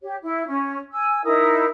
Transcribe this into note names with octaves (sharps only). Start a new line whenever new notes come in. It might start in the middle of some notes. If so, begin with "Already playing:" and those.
G4 C#5
E4
C#4
G#5 E6
D#4 E4 A#4 D#6